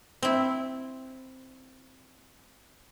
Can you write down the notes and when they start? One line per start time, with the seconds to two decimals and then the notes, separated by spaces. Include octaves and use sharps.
0.22 C4 E4